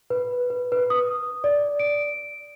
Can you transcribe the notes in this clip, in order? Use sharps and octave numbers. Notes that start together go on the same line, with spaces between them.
B4
B4
B4
D#6
D5
D7